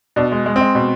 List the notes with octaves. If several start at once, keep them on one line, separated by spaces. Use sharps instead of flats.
B2 D4
G#3
G#3
C4
G#3
B2